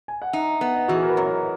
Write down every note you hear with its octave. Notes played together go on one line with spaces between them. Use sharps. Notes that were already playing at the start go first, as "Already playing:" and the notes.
G#5
F#5
D#4 E5
B3
D#5
E3 F#4
G#4
A#4
B4
F#2 C#5